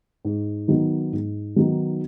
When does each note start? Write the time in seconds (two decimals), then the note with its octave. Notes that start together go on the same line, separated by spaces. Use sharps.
0.25 G#2
0.68 D#3 F#3 B3 D#4
1.12 G#2
1.56 D#3 F#3 B3 D#4